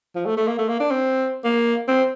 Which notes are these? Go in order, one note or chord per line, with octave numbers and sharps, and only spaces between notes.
F3
A3
A3
A#3
A3
A#3
D4
C4
A#3
C4